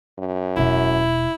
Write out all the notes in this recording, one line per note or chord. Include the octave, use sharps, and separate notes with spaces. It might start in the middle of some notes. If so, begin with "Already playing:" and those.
F#2
E1 B2 E4